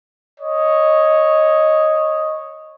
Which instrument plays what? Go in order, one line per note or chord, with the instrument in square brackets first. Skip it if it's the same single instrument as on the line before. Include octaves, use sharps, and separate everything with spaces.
[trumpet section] C#5 D#5